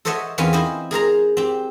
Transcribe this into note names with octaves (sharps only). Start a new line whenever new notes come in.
A4 C5 C#5 D#5 E5 F#5
E2 C4 C#4 F4 B4 G#5
E4 C5 D#5
G#4 A#4 C5 A#5
C4 G4